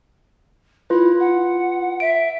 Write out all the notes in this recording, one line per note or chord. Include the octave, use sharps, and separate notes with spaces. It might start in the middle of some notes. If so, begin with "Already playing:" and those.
E4 F4 B4
F#5
E5 D7